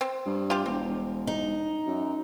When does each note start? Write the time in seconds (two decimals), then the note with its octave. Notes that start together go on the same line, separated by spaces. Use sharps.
0.01 C4
0.26 G2
0.50 F4 G4
0.66 E1 C4
1.27 D#4
1.86 F#2